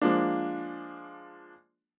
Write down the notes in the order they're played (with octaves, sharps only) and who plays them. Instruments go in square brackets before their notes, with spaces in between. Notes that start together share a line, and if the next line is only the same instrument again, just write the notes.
[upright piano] F3 G#3 A#3 D4